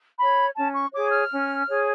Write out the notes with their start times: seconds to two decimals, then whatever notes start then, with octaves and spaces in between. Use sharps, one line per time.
0.19 C#5 B5
0.56 C#4 A5
0.74 C#6
0.93 G#4 C#5 D6
1.12 F6
1.31 C#4
1.67 G#4 C#5